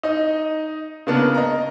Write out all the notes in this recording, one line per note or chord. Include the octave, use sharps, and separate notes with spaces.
D#4 D#5
C#3 A#3 B3 D4 A#4
D#5 A#5